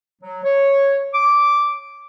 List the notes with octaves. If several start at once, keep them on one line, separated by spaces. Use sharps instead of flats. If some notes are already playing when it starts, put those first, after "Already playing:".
F#3
C#5
D6